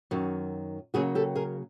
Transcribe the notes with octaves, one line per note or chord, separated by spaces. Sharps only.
F#2 D#3 F#3
C#3 F#3 A#3 F#4 G#4
G4 A4
G#4 A#4